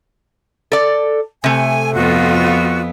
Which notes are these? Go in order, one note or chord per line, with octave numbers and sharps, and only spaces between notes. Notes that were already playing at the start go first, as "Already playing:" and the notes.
A4 D5
C3 A3 G#5
F2 B3 F4 F#4